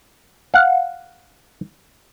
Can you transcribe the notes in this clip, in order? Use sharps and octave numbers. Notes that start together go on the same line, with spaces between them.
F5 F#5